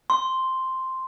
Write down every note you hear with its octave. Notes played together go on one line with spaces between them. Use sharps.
C6